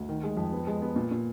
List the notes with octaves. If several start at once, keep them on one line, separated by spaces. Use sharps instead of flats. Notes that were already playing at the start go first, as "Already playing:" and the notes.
Already playing: D2
D#3
G#3
F2
B3
G#3
B3
A#2
A#2